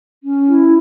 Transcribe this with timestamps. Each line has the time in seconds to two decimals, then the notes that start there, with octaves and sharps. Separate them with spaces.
0.24 C#4
0.47 E4